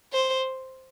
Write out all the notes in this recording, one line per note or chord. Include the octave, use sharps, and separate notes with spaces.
C5